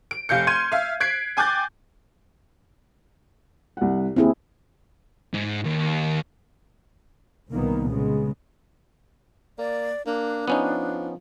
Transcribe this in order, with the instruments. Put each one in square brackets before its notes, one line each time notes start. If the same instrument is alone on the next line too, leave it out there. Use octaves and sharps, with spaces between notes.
[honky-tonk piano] D7
F1 F5 G6 C#7
C6 F6 G#6 D#7
E5 F5 F6
F#6 G#6 B6 C7 D7
G5 G#5 D6 F#6 G6 A6
[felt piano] C2 F#5
[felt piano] D#2 [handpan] C4 E4 G#4
[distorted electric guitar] G#2
D#2
[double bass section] C2 A#2 D#3 A#3 B3
C#3 G#3 B3
[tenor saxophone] A#3 [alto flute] D5
[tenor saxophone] A#3 [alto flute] D4
[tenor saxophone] F3 [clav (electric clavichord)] B3 C#4 D#4